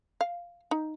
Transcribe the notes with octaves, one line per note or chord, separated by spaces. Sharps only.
F5
D#4